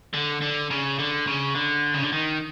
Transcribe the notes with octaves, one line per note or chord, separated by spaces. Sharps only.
D3
D3
C#3
D3
C#3
D3
C#3
D3
D#3